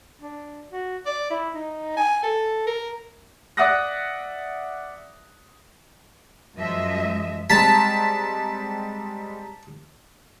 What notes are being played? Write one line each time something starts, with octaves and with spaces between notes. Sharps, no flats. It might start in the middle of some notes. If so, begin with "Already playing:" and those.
D4
F#4
D5
E4
D#4
G#5
A4
A#4
D5 E5 F#5 D#6 F#6 A#6
F#2 F3 G#3 D#5 E5
G3 G#3 C4 A5 A#5 B6